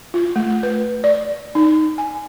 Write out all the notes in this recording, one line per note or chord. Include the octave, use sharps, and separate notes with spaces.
F4
A3
B4
D5
D#4
G#5